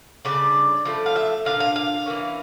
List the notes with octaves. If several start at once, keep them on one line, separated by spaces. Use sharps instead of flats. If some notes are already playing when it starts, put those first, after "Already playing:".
C#3 G3 D4 D5
F3 A3 E4
F5
E5
A#2 G3 D4 F4 F5
F5
F5
E3 A#3 C#4